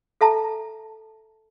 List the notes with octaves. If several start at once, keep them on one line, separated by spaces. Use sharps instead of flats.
A4 E5 A5 A#5